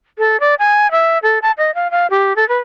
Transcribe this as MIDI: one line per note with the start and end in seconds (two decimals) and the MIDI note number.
0.18 0.40 69
0.40 0.55 74
0.59 0.90 80
0.91 1.18 76
1.23 1.39 69
1.42 1.52 81
1.58 1.74 75
1.75 1.91 77
1.91 2.07 77
2.10 2.36 67
2.36 2.47 69
2.49 2.58 71